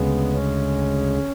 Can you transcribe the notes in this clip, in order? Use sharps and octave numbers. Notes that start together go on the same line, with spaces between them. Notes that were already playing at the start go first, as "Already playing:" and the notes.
Already playing: D2 C#3 G#3 B3
C#4